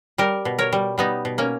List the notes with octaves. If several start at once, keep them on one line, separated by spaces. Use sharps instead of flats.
G3 G4 A#4
B2
A#4 C#5
G3
G3 B3 D#4
B2
A#3 C#4